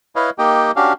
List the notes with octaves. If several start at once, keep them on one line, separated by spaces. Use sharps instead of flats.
E4 B4 C#5 D#5 F5
A#3 D#4 G4 D#5 G5
C#4 D4 F#4 G4 F5